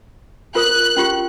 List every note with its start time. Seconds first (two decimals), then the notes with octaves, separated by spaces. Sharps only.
0.55 F4 A#4 D#6 F#6
0.97 C#4 F4 G4